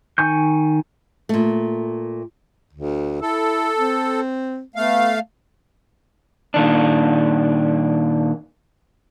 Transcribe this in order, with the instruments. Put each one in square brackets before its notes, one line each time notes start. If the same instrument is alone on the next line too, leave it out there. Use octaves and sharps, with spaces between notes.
[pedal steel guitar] D#3 G#5 C#6 G6
[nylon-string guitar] A#2 A3
[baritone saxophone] D2
[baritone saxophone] E4 [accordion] A4
[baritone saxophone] C4
[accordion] A3 F5 [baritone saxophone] B3
[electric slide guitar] A#2 D#3 D4